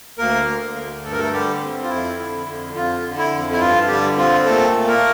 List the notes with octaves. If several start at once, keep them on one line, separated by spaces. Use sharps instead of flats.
D2 A#3 A#4
D3
D2
G2 A4
A#4
A3 A4
D3 G3 G4
C4
F4
F2 E4
D3
F2
F2 F4
D3
E4
F2
E4
G2 F4
D3 G3 G4
C4 F4
A#2 A3 A4
A3
A#3 A#4